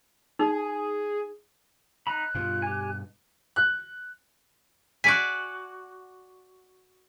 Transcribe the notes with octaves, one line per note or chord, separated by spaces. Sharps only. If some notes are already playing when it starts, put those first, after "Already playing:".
D#4 G#4
D#4 A#5 B5 F#6
G2 B2 F4
G4 G#5
F#6
F#4 D5 G#5 B6